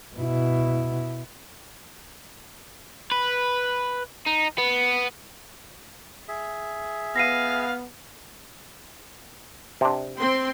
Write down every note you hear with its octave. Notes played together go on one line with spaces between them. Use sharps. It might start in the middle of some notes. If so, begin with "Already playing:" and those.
B2 E4
B4
D#4
B3
G#4 E5
B3 F5 A#6 C7 D#7
C3 D4
C4 G5 C6